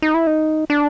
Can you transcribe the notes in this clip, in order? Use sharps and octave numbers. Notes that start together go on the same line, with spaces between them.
D#4
E4
D#4
D4